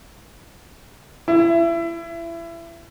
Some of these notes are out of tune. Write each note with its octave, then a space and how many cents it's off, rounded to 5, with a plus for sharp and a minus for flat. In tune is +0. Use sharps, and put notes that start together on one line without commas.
E4 +30